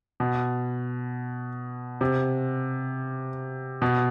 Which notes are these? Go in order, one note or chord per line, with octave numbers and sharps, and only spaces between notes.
B2
C3
B2